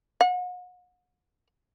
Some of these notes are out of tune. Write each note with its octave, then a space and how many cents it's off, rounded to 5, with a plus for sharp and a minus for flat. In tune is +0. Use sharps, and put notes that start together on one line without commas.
F#5 -40